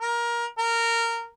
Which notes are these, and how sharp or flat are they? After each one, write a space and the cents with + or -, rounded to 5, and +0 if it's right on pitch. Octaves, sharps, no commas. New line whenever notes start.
A#4 +20
A#4 -15